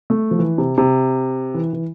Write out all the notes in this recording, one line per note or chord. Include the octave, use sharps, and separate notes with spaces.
A3
F3
E3
C3
C3
E3
E3